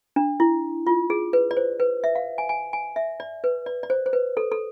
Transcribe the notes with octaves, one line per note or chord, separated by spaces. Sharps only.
D4
E4
F4
G#4
B4
D5
C5
B4
E5
F5
G#5
G#5
G#5
E5
D5
B4
D5
D5
C5
C5
B4
A4
A4